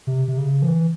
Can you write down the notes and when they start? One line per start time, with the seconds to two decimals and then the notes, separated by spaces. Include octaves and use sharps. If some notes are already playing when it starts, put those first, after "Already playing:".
0.07 C3
0.28 C3
0.38 C#3
0.62 F3
0.66 E3